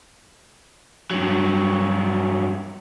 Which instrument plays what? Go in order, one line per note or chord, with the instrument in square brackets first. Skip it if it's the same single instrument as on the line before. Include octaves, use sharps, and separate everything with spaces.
[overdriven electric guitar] G2 F#3